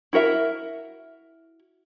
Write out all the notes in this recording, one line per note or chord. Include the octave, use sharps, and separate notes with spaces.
E4 F#4 A#4 E5